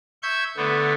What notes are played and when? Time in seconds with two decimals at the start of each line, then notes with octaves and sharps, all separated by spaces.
0.23 E5 C#6 G6 G#6
0.57 D3 A3 B3